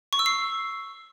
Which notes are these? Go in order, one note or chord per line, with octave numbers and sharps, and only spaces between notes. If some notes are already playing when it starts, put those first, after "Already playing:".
C#6
E6
C7